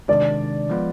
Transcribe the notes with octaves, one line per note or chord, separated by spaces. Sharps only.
C3 D#3 G#3 D4 D5
F3 G#3 B3 F4 B4